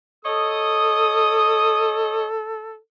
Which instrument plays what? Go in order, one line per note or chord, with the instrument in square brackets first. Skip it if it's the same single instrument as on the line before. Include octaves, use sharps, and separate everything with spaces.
[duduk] A4 [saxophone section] C#5 D#5 [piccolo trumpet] D#6